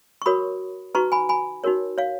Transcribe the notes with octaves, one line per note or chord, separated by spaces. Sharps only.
C#6
F#4 A#4 C#5 B5 D#6
D#4 F#4 B4 A#5 C#6
G#5 B5
G#5 B5
D#4 F#4 A#4 C#5
C#5 F5